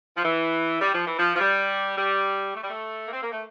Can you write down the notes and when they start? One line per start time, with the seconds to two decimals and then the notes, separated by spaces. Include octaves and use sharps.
0.16 F3
0.23 E3
0.80 G3
0.93 F3
1.05 E3
1.18 F3
1.35 F3
1.39 G3
1.97 G3
2.55 A3
2.62 G3
2.69 A3
3.06 A#3
3.12 C4
3.22 A#3
3.32 A3